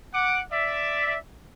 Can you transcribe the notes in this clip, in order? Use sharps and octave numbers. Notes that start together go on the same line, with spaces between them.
F#5 D6
D5 E5